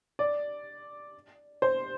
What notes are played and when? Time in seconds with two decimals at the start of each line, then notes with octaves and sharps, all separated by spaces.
0.19 D5
1.62 C5